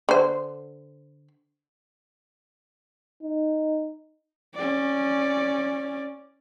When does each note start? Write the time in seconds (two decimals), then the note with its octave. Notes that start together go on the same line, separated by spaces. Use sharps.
0.09 D3 C5
3.23 D#4
4.55 C#4 D5